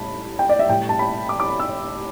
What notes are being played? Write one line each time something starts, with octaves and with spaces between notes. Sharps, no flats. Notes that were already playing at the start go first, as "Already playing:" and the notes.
Already playing: A2 G3 A5 B5
G5
D5
E5
A2 G3 G5
A5
B5
D6
D6
B5
E6